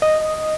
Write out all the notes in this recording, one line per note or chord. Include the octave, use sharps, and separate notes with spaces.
D#5